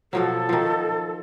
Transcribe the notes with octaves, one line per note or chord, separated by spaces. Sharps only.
B2 F3 F#3 A4
D#3 F3